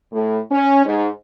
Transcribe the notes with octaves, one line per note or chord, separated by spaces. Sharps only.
A2
C#4
G#2